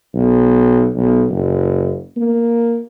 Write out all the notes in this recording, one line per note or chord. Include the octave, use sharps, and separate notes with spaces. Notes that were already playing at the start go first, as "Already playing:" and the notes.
B1
B1
F#1
A#3